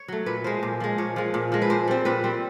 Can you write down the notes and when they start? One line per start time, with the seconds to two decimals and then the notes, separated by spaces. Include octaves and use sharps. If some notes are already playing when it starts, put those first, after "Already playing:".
Already playing: C#5
0.08 F#3 A3
0.26 A#2 B4
0.44 F3 G#3 C5
0.63 A#2
0.80 F3 G#3
0.98 A#2 C#5
1.16 F3 G#3
1.34 A#2
1.52 F3 G#3
1.62 B4
1.70 A#2 C5
1.88 G3 C4
2.05 A#2 B4
2.24 G3 C4